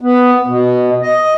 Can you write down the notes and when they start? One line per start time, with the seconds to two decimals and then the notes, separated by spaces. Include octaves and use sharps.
0.01 B3
0.47 B2
1.02 D#5